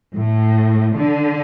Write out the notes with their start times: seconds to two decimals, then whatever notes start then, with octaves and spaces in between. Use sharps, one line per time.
0.16 A2
0.98 D3